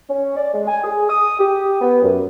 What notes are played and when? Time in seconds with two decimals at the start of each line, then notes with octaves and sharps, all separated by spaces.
0.09 C#4
0.37 D5
0.54 G#3
0.67 G#5
0.83 G#4
1.09 D#6
1.39 G4
1.81 B3
2.02 F#2